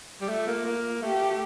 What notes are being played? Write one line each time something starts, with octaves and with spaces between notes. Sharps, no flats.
G3
A3 F4
A#3
A#3
A3 G4